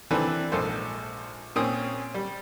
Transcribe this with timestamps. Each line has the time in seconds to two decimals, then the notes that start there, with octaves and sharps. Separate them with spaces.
0.11 E3 C4 D4 A4 B4
0.52 A#1 G#2 A4 C5
1.56 A#2 C4 C#4 D#6
2.14 G3